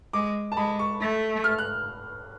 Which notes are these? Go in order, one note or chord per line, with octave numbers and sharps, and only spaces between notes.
G#3 D6
A5
G#3 B5
C#6
A3
F6
F#6